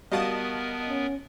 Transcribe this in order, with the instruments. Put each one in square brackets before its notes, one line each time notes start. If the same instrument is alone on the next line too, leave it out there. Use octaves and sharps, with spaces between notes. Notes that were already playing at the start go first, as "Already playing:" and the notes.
[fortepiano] G3 F#4 F5 [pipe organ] B3 A#4 [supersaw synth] D#5 A5 D#6
[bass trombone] C#4